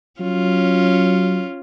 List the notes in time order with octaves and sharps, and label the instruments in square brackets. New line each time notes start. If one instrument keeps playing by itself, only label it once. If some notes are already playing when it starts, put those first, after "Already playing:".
[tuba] F#3 [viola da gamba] C#4 F4